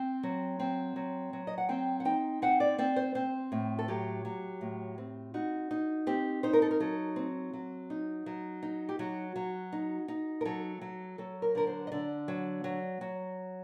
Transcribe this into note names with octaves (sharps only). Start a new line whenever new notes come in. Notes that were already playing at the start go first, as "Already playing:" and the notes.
Already playing: C4
F#3
C4
F#3
F#3
D#5
F#5
C4 G5
F#5
D#4 G5
C4 F#5
D5
C4 D5
C5
C4 C5
A2
A4
F#3 G4
F#3
A2
C4
D#4 F#4
D#4
C4 G4
D#4 C5
A#4
A4
A#4
F#3 A4
C4
F#3
D#4
F#3
D#4
G4
F#3 F#4
F#3
D#4
D#4
A#4
F#3 A4
F#3
F#3 A4
A#4
D3 A#4
C5
D#5
D3 D5
F#3
F#3
F#3